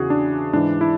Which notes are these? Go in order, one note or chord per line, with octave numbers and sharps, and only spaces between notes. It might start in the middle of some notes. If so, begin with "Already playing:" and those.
Already playing: E2 C#3 E3 F#4 G#4
D4
G#2 E3 D4
E4